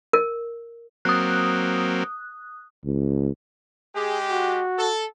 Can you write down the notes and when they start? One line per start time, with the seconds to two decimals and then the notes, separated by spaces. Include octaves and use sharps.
0.13 A#4
1.05 F#3 A#3 C4 D#6 F#6
2.85 C#2
3.96 G#3 G4 G#4
4.31 F#4
4.79 A4